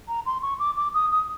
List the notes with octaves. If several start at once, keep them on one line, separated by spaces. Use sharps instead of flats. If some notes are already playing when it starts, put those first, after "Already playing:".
A#5
C6
C#6
D6
D6
D#6
D#6